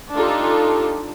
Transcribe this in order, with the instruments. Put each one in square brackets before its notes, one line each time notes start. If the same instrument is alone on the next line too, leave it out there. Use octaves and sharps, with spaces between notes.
[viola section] D4 D#4 F4 G4 A4